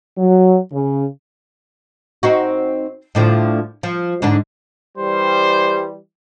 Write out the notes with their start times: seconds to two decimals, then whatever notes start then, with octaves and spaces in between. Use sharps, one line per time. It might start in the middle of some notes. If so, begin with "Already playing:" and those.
0.18 F#3
0.73 C#3
2.23 C4 D#4 F#4
3.15 A2 D3 F3
3.83 F3
4.22 G#2 D3 D4
4.98 E3 G3 C5